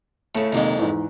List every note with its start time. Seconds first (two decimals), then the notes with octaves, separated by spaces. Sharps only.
0.35 A2 C#3 A3
0.53 A#1 F2 C3 D#3 G#3 A#3
0.78 E2 G#2